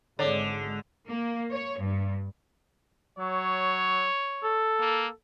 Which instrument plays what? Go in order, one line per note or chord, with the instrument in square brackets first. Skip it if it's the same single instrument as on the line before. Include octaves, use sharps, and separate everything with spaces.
[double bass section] G#1 G#3 [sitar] D3 [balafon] C#5 D5
[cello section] A#3
C#5
G2
[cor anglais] F#3 [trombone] C#5
[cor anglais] A4
[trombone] A#3